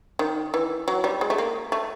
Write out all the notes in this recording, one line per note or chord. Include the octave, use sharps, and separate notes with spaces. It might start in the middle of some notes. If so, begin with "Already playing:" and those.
D#3
E3
F#3
G3
G#3
A3
A#3
A3